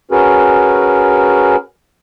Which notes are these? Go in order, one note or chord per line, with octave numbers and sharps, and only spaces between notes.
C#4 F#4 G#4 A#4 B4